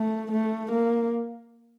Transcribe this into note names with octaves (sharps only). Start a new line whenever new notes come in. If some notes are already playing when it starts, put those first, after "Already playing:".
Already playing: A3
A3
A#3